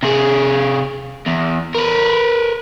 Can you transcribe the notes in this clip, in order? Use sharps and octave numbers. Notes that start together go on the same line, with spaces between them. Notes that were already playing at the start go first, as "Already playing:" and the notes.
C3 G#4
E2
A#4 B4